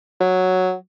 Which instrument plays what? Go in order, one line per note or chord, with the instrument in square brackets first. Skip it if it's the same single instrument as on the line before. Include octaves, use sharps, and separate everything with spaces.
[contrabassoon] F#3